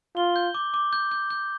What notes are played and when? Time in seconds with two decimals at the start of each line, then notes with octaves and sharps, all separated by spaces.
0.16 F4 G7
0.36 G6
0.54 D6
0.74 D6
0.93 G6
1.12 G6
1.30 G6